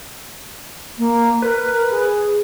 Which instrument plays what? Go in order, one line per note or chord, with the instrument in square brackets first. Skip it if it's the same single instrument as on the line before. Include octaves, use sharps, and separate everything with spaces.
[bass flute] A#3
[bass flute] A#4 [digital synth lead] B4
[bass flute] G#4